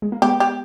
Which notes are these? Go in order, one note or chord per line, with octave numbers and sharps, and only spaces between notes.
G#3
A#3
G#3 B3 G4
G4